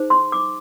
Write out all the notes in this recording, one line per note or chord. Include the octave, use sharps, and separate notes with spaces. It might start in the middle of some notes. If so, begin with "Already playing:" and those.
Already playing: D#4 G#4 C5
C6
D6